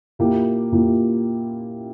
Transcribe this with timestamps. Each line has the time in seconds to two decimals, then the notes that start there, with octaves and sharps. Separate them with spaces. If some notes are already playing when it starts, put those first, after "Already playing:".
0.19 A#2 A#3 E4 G4
0.72 A#2 A#3 E4 G4